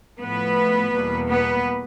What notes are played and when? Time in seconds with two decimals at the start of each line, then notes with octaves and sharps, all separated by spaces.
0.19 A2 F3 A3 B3 B4
0.92 E2 B2 G3 A#3
1.28 B3 B4